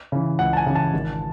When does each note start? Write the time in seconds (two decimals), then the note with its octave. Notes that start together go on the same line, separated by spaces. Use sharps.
0.12 C#3 E3
0.39 C#2 F#5
0.53 A5
0.57 G#5
0.66 C#3 E3
0.75 A5
0.93 G#1